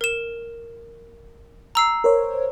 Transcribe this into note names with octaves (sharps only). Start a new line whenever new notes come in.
A#4 E7
A#5 E6 C7
A#4 C5 C#5